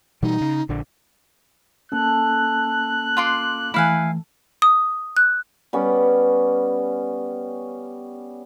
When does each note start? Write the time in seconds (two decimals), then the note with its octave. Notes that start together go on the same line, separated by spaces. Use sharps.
0.23 B2 E3 G3 D#4
0.41 C#3
0.69 A#1 D3
1.92 A#3 C#4 A4 F#6
3.17 F4 C6 D6
3.74 E3 A3 E4 F5 G#5
4.62 D#6
5.17 F#6
5.73 G3 B3 C#4